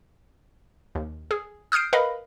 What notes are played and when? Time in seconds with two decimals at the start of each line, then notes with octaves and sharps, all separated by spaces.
0.95 D#2
1.31 G#4
1.72 D#6 F6 G6 C7 D7
1.93 A#4 B4 D#5 F5 B5